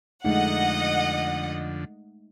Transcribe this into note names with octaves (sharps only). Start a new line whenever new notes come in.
F2 D3 G#3 A3 D#4 D#5 F#5